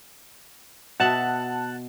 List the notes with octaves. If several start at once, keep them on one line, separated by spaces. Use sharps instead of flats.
B2 E5 F#5 A5 F#6